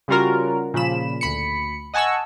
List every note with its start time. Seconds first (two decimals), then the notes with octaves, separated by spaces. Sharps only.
0.08 C#3 G3 C#4 F4 F#4 A#4
0.74 A#2 C#3 F3 B5 E7
1.21 D2 B5 C#7
1.94 D#5 F#5 G#5 A5 C#6 E6